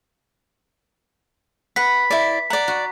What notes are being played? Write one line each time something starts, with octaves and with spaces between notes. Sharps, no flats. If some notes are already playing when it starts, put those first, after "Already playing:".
B4 F#5 B6
E4 D5
D5 F#5 A#5
F#4